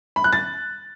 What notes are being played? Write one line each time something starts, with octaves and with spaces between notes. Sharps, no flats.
B5
F#6
A6